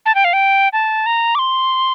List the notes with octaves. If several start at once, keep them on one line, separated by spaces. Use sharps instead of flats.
A5
G5
F5
G5
A5
A#5
D6
C6